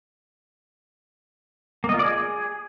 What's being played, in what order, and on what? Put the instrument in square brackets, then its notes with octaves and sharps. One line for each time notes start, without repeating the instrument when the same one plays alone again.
[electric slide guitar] A#3
D#5
F4
D5
G#4